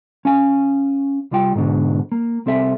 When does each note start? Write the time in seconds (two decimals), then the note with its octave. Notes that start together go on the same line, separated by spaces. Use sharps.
0.25 C#4 F5 G#5
1.31 C2 G3 F4 G5
1.55 G#2 B2 D3
2.12 A#3
2.46 C2 C4 A4 E5